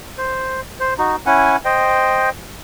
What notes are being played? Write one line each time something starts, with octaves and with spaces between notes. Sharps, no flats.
C5
C5
D#4 F#4
C#4 E4 F#5 G#5
C5 D#5 G5